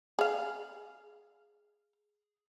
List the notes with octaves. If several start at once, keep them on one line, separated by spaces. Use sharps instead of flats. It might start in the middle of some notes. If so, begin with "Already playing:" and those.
G#4 F5